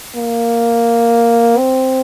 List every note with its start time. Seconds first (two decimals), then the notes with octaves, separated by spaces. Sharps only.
0.16 A#3
1.58 C4